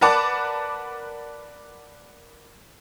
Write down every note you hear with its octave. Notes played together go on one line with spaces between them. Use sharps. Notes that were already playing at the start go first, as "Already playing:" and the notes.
A#4 B4 D5 F#5 A5 D6